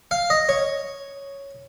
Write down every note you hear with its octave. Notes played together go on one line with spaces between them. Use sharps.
F5
D#5
C#5